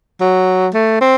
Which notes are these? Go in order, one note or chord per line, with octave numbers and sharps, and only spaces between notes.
F#3
A3
C4